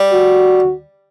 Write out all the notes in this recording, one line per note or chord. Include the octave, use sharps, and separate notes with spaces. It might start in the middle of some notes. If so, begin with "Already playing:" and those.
Already playing: G3
F#4